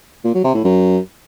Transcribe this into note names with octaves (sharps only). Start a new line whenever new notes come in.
A#2
F#3
C3
A2
F#2